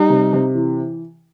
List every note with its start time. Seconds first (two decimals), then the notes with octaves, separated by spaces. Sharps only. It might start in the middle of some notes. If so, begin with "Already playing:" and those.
Already playing: G3 D#4
0.10 C3
0.33 C3
0.55 E3